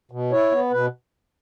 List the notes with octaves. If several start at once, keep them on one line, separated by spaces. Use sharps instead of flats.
B2
E4 C#5
B3
B2 B4